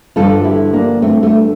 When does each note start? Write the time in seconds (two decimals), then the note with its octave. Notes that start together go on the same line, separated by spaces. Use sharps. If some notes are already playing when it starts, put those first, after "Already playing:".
0.16 G2 D3 F3 F4 A4
0.44 E4 G4
0.73 A#3 D4
1.02 A3 C4
1.23 A3